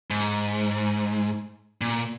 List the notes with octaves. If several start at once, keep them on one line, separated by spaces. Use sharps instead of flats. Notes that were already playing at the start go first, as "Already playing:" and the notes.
G#2
A#2